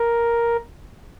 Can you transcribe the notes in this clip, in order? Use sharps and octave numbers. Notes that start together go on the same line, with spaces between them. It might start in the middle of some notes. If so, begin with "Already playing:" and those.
Already playing: A#4